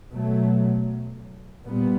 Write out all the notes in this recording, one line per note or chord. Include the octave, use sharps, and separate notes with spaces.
B2 F#3 A3
A#2 G3 B3